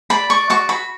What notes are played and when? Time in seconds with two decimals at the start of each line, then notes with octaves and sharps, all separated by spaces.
0.10 D5 B5
0.30 D5 C#6
0.50 F#4 C#6
0.69 F#4 B5